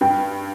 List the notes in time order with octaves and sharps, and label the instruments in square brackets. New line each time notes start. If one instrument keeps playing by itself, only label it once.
[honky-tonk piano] G2 [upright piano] G5